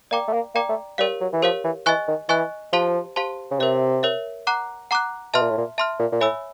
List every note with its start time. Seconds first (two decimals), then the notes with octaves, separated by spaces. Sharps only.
0.11 A#3 D5 G5 A#5 D6
0.28 A3
0.33 A#3
0.55 A#3 D5 G5 A#5 D6
0.69 A3
0.98 G3 G4 A#4 C#5 F5
1.21 F#3
1.33 E3
1.42 F3 G4 A#4 C#5 F5
1.64 E3
1.86 E3 D#5 G#5 C#6 F#6
2.08 D#3
2.29 E3 D#5 G#5 C#6 F#6
2.72 F3 G4 C5 F5 A5 C6
3.16 G4 C5 F5 A5 C6
3.51 C#3
3.59 C3 A#4 C#5 E5
4.03 A#4 C#5 E5
4.47 F#5 A#5 D6 F#6
4.91 F#5 A#5 D6 F#6
5.34 B2 E5 A5 C6 F6
5.42 A#2
5.50 A2
5.57 A#2
5.78 E5 A5 C6 F6
5.99 A#2
6.12 A#2
6.21 A2 C#5 E5 G#5 B5 E6